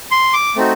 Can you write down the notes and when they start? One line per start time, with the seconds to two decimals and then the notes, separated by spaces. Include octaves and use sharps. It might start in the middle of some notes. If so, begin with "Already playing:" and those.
0.11 C6
0.33 D6
0.56 A3 C4 D#4 F#4